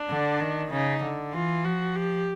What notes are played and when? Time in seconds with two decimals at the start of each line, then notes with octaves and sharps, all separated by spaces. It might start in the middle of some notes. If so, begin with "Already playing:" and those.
Already playing: D4
0.09 D3
0.40 D#3
0.71 C#3 D#4
1.03 D3
1.33 E3 F4
1.64 F3 F#4
1.96 G4